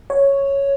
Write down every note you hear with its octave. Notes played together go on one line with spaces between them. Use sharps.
C#5